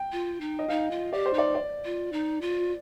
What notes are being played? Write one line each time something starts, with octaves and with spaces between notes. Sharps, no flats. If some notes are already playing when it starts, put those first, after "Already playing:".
Already playing: G5
F4
D#4
D#5
D#4 F5
F4
G4 D5
C5
D#4 D5
D5
F4
D#4
F4